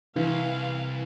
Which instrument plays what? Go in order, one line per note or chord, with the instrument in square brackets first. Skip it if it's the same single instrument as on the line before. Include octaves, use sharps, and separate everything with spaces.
[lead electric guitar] C2 [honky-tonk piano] E3 [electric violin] F5